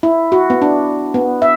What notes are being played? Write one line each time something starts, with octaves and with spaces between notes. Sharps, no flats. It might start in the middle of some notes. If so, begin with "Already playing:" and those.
E4
F#4
B3
D4
B3
E5